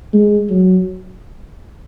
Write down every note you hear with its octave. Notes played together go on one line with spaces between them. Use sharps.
G#3
F#3